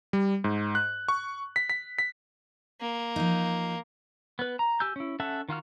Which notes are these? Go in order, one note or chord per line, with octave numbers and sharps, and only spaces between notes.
G3
G#2
F#6
C#6
B6
B6
B6
A#3
F3 D#4
B3 B4
A#5
G4 G#5 E6 G6
C#4 E4
C#4 A4 E5 F#5 A5
D#3 F4 F#4 F6